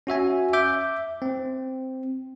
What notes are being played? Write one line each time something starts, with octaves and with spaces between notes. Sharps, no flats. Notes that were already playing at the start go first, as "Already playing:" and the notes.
C#4 F#4 E5 G#5
E5 D6 G6
C4